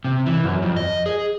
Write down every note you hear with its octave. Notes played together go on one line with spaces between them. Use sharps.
C3
E3
F#2
F2
D#5
G#4